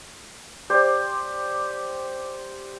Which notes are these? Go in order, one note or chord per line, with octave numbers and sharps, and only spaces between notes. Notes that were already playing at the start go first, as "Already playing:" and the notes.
G4 C5 D5